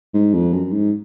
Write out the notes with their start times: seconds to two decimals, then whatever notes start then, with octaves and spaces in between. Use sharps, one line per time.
0.14 G#2
0.34 F2
0.53 F#2
0.73 G#2